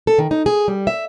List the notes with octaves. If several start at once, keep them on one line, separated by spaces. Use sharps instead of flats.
A4
D#3
D#4
G#4
G3
E5